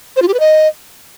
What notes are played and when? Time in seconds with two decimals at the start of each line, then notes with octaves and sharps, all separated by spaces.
0.16 C5
0.22 F4
0.28 G4
0.34 B4
0.40 D#5